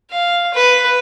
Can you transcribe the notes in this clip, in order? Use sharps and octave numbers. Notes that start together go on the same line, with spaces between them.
F5
B4